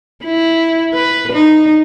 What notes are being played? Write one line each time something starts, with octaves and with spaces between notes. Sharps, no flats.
E4
B4
D#4